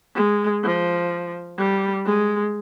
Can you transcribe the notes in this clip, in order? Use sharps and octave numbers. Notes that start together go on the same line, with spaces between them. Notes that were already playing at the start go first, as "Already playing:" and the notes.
G#3
F3
G3
G#3